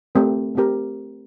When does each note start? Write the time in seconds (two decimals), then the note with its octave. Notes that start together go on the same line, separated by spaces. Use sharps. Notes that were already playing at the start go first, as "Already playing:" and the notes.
0.15 A3 C4 G4 A#4
0.55 A3 C4 G4 A#4